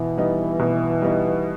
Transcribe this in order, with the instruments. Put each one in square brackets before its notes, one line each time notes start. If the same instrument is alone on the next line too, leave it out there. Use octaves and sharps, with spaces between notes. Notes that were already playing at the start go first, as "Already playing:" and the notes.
Already playing: [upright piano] B2 [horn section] E3
[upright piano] G3 B3 D#4
B2
G3 B3 D#4